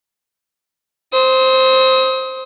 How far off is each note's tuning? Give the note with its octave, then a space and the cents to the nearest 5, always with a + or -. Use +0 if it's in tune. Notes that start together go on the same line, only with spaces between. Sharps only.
C5 +0 D#6 +40